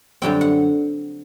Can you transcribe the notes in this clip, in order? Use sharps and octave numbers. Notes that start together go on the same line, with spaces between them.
F#2 D3 G3 C4 G5
F#5